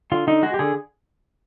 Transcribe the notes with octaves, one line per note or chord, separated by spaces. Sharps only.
D3 F4
D3 D#4
G#3 F#4
G4
D3 G#4